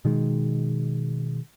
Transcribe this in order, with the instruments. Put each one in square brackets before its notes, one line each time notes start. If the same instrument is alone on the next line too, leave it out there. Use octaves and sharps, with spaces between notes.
[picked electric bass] B2 D#3 G#3